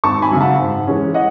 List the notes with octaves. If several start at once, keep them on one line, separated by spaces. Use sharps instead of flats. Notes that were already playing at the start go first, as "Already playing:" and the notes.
G#1 A5 C#6
G#5 B5
F#2 C#3
F#5 A5
G#2
E3 G#3 C#4
D#5 F#5